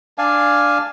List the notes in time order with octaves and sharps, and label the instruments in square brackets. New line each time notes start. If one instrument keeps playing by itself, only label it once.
[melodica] D4 D5 F5 G#5